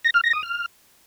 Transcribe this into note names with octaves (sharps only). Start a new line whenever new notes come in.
A#6
F6
A#6
D#6
F6